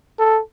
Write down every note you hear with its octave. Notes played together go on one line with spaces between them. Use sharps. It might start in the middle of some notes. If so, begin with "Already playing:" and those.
A4